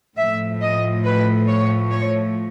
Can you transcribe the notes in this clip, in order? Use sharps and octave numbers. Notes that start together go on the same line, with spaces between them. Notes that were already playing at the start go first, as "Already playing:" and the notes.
A2 F3 E5
D#5
B4
C#5
C#5